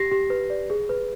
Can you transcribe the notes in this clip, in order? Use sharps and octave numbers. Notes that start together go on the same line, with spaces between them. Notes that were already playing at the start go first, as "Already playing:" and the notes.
Already playing: G4 A#6 C7
G4
B4
D5
G#4
B4